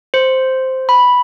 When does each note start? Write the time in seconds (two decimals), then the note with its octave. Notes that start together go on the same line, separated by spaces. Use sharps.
0.14 C5
0.89 B5